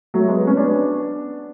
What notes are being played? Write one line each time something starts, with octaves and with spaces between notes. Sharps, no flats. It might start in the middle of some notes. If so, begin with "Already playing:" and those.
F#3 A3
G#3 B3
C#4
B3 D4